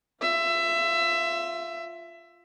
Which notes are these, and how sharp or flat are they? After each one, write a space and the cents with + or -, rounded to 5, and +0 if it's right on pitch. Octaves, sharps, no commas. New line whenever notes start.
F4 +0 E5 +20